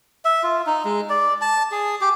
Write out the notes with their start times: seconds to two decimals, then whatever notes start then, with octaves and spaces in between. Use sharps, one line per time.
0.25 E5
0.43 F4
0.66 D#4
0.85 G#3
1.10 D5
1.41 A5
1.72 G#4
2.01 G4